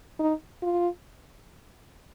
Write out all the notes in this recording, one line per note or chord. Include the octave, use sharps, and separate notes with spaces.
D#4
F4